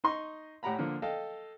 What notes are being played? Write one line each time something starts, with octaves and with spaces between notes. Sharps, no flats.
D#4 D#5 C6 C#6
A2 G4 F#5 A#5 B5
D3 F3 A#3
A4 D#5 F5 G5